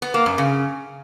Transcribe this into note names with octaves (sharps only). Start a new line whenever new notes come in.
B3
A#3
F#2
C#3